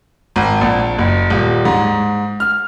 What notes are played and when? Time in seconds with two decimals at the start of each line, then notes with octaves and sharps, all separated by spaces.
0.36 G#1
0.61 A#1
0.98 F#1
1.30 D#1
1.65 G#2
2.40 F6